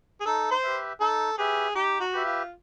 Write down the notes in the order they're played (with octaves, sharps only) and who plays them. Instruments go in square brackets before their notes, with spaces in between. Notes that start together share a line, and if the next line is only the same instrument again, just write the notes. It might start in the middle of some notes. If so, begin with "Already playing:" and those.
[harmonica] G#4
[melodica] D#4 [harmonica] A4
[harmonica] C5
[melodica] G4 B4 E5
[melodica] D#4 [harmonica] A4
[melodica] G4 B4 E5 [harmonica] G#4
[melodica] D#4 [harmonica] G4
[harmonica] F#4
[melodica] G4 B4 E5
[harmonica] F4